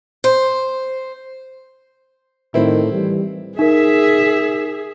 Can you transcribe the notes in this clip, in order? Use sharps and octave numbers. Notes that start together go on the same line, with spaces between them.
C5
A2 D#3 C4 E4
E3 G3
D#4 G#4 A#4 E5